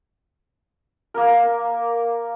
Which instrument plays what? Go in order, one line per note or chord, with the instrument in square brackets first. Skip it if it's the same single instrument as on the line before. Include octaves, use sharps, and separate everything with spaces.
[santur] A#3 A#4